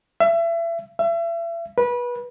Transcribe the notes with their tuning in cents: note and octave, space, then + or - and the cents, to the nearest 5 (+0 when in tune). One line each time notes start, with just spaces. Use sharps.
E5 +30
E5 +35
B4 -25